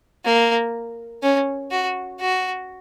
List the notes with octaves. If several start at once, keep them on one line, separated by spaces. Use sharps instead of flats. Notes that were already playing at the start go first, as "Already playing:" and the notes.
A#3
C#4
F#4
F#4